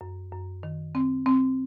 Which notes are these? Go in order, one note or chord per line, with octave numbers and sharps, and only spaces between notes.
F#2
F#2
D#3
C4
C4